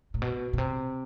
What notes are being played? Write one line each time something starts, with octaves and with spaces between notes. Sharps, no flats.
A2
B2
B2
C3